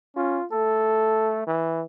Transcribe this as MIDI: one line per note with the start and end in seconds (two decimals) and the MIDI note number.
0.16 0.40 61
0.16 0.45 65
0.53 1.43 57
0.53 1.42 69
1.47 1.83 52